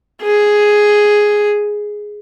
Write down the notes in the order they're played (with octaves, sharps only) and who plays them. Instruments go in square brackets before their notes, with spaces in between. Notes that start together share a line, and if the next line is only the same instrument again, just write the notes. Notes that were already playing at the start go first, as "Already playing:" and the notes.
[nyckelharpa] G#4